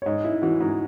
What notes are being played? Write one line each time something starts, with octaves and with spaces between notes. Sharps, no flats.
C#5
G#2 D#5
E4
E3 F#4
G#2